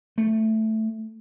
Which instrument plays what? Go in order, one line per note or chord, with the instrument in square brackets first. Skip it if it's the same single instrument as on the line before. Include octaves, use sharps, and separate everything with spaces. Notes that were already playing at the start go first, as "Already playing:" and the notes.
[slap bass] A3